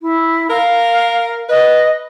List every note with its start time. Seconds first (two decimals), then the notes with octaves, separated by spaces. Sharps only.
0.02 E4
0.50 A#4 F5
1.49 B4 D#5